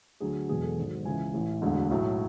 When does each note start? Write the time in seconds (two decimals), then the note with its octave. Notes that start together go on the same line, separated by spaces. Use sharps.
0.20 D2 D3 F#3 G#4
0.35 F#4
0.49 E1 E2 B2 F#3 G#4
0.63 A4
0.77 G#1 G#2 F#3
1.05 C#2 C#3 E3 G#5
1.33 A1 A2 E3
1.62 E1 D2 D3
1.90 B1 A2 F#3